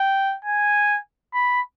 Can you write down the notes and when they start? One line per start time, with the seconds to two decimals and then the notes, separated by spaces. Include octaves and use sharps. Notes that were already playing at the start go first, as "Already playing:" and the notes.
Already playing: G5
0.44 G#5
1.34 B5